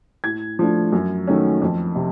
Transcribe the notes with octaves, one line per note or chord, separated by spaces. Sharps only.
A2 G#6
F3 A3 D4
F#2
D#3 F#3 A3 C#4
F2
C3